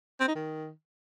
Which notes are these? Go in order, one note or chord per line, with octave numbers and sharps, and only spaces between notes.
C4
D#4
D#3